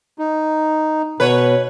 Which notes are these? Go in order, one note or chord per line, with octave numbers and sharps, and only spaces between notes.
D#4
B2 B4 C#5